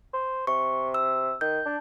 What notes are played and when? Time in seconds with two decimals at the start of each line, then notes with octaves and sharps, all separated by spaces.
0.14 C5
0.47 C3 C#6
0.94 E6
1.41 D#3 G6
1.66 D4